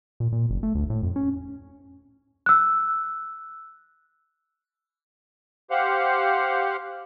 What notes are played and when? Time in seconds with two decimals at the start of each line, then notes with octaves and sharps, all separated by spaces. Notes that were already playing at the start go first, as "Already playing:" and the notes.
0.20 A#2
0.32 A#2
0.50 F#1
0.63 A3
0.75 D2
0.90 A2
1.03 F2
1.16 C#4
2.46 E6 F#6
5.71 G4 C5 F5 F#5